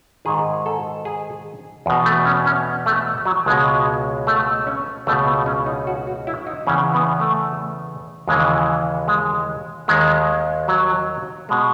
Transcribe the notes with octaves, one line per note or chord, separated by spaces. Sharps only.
G#2 D#3 G#4
A4
G#4
E2 B2
A3
C#4
C#4
A3
F#3
C#2 B2 G#3
A3
C#4
C#2 B2 A3
B3
C#4
D#4
F#4
F#4
E4
D#4
E2 C#3 E3 C#4
B3
A3
D#2 C#3 E3 G#3
G#3
D#2 D#3 G#3
F#3
B2 G#3